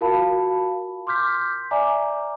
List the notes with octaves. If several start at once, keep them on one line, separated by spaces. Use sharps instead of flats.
F4 F#4 A#4 F5 A5 B5
C6 D6 F6 G6 B6
D5 E5 G#5 A#5 D6